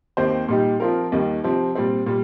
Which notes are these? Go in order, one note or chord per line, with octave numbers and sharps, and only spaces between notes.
D#2 D#3 C4 G4 C5
A#2 G3 D#4 G4
F3 C4 F4 A#4
D#2 D#3 G3
C3 F3 C4
A#2 G3 C4
A#2 G3